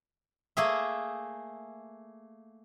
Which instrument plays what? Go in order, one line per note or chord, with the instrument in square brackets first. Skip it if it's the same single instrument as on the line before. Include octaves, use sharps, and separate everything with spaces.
[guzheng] A3 A#3 G#4 E5